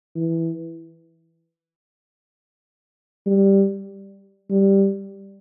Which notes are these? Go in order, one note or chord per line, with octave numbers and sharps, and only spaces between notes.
E3
G3
G3